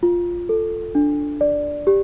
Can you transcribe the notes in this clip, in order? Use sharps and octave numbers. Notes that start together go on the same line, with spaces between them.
F4
A4
D4
D5
G4